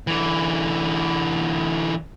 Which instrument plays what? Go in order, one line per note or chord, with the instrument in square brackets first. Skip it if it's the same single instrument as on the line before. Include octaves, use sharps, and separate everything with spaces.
[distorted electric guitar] D3 E3